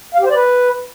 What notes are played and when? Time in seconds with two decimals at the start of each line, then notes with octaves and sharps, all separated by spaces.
0.15 F5
0.20 G4
0.25 C5
0.30 D5
0.35 B4